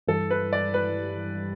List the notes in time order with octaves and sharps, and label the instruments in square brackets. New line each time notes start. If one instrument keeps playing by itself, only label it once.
[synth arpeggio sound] G2 E3 G3 [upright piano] A4
[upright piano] B4
D5
B4